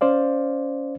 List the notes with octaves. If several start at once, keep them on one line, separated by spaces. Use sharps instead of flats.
C#4 C5 D5 F5